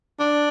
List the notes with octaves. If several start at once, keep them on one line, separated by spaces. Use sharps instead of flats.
D4